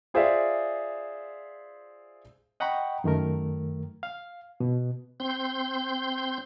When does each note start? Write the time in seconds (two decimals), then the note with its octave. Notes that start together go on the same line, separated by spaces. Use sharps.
0.14 F4 G#4 C5 D5 E5 F5
2.60 D#5 F#5 G5 A#5 B5 C#6
3.04 F#2 D#3 A3 A#4
4.03 F5
4.60 B2
5.20 C4 C6 G6